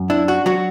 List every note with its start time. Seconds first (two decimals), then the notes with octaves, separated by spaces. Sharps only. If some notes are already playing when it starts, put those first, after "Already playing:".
Already playing: F#2
0.10 D4 E4
0.28 F#4
0.46 F#3 F#4